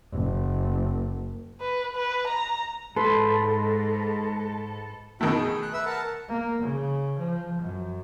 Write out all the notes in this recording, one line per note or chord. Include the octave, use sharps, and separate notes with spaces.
F#1
B4
B4
A#5
G#2 A4 B4 C6
B2 D#3 A3 E4 F#4 G5
G#4
F#6
B4 E5 E6
A#4 F#5 A5
A#3
C#3
F3
F#2